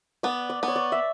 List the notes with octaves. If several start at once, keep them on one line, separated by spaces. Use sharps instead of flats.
B3 D5
D5
B3
C#5
D5
E5